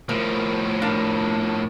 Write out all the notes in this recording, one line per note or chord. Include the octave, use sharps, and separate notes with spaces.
A2 F3 A#4
D4 A#4 F5